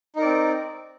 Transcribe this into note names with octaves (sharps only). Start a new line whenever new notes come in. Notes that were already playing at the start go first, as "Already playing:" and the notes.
C4 D#4 A#4 D5